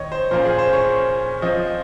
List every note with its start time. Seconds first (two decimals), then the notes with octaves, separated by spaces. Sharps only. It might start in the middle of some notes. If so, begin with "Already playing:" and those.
Already playing: D#3 C#5 D#5
0.12 C5
0.31 A#2 F3 A#3 C#4 C5
0.45 G#4
0.59 C5
0.73 C#5
1.42 F3 C4 D#5